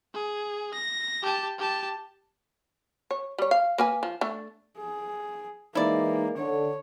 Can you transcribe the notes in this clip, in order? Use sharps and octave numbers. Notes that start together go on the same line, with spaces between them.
G#4
A#6
G4 A5
G4 A5
C#5
G3 C#5
F5
A#3 B4 G#5
F3
A3 D4
G#4
E3 G#3 A#3 D#4 E4 D5
D3 C#5